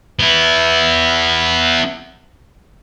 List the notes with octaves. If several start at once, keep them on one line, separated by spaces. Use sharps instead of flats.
B3 E4